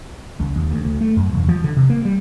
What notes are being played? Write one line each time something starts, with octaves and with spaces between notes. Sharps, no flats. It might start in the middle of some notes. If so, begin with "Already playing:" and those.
C#2
D#2
D2
D2
A3
F#2
E1
F3
D3
C3
A#3
G3